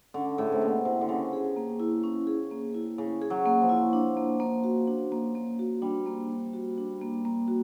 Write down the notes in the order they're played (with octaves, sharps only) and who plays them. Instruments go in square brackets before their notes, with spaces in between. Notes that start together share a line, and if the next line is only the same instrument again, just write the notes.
[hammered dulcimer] D3 [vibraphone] C#4
[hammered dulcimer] A2 [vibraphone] G#4
[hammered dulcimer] C3
[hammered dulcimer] B2 [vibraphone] A#3
[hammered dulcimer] C3 [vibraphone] E4
[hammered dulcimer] D3
[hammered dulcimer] C#3 [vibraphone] C#4
[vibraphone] G#4
A#3
E4
C#4
G#4
A#3
E4
[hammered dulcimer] C#3 [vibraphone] C#4
[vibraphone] G#4
[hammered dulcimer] F#3
[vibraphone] A#3
[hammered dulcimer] F3
[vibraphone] E4
D4
A#3
A#3
F#4
D4
A#3
A#3
F#4
[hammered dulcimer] G3 [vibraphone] D4
[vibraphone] A#3
A#3
F#4
D4
A#3
A#3
F#4